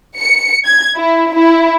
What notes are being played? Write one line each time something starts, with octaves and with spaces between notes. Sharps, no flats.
C#7
G#6
E4
E4